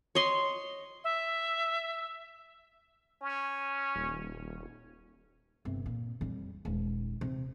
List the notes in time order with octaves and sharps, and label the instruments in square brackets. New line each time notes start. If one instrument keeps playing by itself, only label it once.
[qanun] C#5 D#5 C6
[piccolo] E5
[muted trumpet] C#4
[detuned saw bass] D#1
D#1
[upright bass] G1 C3
A#2
F2 G3
D#1 G#3
C3